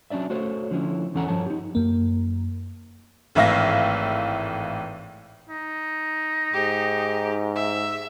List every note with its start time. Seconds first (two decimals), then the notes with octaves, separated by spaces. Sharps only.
0.10 F#3 C#4 D4 D5 E5
0.30 A3 F#4 A4 C5 C#5
0.71 D3 F3 C#4 E4
1.14 E2 E3 C#4 A4 F#5 A#5
1.28 G2 F3 A4 C#5 A5
1.46 D#4 G4
1.75 F#2 A#3
3.35 G#1 A2 E3 E5 F5 A#6
5.49 D#4
6.54 G#2 G4
7.56 E5